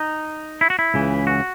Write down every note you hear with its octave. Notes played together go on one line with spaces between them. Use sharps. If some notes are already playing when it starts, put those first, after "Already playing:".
Already playing: D#4
E4
F#4
E4
C#2 C#3 E3
F#4